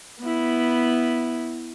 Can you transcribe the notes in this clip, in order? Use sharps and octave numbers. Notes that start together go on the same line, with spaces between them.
B3 E4